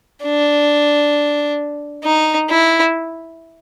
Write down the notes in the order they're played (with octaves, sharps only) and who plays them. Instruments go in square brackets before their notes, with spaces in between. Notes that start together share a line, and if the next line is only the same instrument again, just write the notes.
[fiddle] D4
D#4
E4